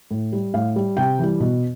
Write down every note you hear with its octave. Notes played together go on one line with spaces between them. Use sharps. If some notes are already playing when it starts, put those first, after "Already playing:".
A2
G3
A2 F5
G3
C3 G5
E3 G3
B2